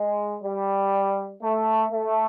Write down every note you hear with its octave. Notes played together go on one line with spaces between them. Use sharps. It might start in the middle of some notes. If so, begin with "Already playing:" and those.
Already playing: G#3
G3
A3
A3